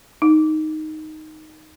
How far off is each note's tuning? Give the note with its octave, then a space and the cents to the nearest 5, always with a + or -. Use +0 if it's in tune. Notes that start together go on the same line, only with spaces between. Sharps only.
D#4 +0